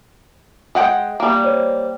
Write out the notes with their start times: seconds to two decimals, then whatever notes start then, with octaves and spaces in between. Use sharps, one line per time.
0.75 G#3 F#5 G5
1.20 G3 A#3
1.44 C5 C#5